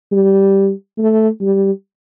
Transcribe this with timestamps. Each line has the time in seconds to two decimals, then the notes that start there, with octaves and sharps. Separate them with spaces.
0.11 G3
0.98 A3
1.41 G3